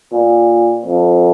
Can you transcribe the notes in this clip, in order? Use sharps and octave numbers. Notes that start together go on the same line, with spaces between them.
A#2
F2